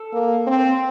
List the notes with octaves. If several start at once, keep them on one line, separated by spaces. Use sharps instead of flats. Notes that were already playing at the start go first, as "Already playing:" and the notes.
Already playing: A4
A#3
C4